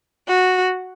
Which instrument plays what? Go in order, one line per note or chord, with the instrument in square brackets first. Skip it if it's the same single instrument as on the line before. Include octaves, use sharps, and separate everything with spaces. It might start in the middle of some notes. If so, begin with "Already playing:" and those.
[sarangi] F#4